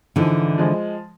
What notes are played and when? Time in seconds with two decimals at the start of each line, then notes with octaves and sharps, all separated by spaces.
0.16 G#2 D3 E3 F3 G#3
0.58 F3 G#3